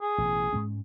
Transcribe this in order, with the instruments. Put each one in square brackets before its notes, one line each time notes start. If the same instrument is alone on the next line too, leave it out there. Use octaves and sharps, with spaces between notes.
[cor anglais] G#4
[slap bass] A1 B2 E3
G#2 G#3 C#4